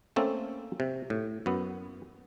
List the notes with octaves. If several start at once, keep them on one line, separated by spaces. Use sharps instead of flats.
A3 A#3 C4 C#4 A4
C3
A2
F#2 B3